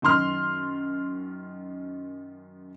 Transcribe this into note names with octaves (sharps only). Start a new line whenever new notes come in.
F#2 D#3 C6 F6